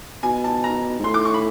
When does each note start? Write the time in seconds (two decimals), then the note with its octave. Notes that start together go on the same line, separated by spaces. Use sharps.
0.23 B2 G#5
0.44 A5
0.64 A#5
0.99 G#2
1.04 A2 C6
1.14 D6
1.25 C#6
1.34 B5